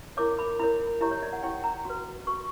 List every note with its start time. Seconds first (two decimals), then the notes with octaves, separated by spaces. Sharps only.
0.17 E4 A#4 C#5 D6
0.39 B5
0.59 E4 A#4 C#5 B5
1.01 E4 G4 C#5 A#5
1.11 C#5
1.23 D5
1.33 F#5
1.43 E4 G4 C#5 G5
1.64 A#5
1.85 F#4 B4
2.27 F#4 B4 C#6